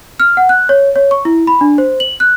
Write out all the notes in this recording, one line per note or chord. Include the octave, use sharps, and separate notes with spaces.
F6
F#5
F#6
C#5
C#5
C#6
E4
B5
D4
C5
F#7
F#6